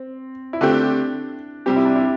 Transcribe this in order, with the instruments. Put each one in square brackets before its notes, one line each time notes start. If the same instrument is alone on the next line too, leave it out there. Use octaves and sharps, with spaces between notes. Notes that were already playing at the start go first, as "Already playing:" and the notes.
Already playing: [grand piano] C4
E4
[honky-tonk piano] D3 A3 C4 G4 [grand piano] D4
[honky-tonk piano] C3 G3 C4 [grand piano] G4
[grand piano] E4
D4
E4